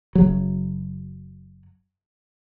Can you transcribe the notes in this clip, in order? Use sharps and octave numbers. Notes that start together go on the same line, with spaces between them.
F#1 F#3